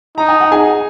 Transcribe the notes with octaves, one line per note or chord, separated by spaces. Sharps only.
D#4 A#5
G#5
F#5
G#4 G#5